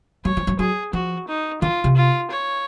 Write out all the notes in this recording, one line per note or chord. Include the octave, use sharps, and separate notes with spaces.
F#3 C#5
F3
F#3
F#3 G#4
F3 F#4
D#4
D#3 F4
C3
F4
C#5